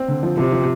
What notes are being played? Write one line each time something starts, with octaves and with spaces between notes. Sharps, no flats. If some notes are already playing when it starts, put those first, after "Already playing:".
Already playing: C4
D3
F3
C3 F3
F3